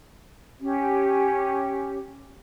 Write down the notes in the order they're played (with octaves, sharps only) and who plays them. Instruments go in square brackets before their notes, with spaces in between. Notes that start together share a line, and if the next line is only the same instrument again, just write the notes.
[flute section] C#4 G4